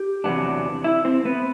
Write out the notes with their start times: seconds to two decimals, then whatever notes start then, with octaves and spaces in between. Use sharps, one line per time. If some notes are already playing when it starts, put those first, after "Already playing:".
Already playing: G4
0.24 E2 C3 F#3 B3 D4
0.84 E4 E5
1.05 C4 C5
1.25 B3 B4